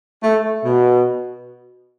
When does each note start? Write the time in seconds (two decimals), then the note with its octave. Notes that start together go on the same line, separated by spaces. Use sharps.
0.23 A3
0.65 B2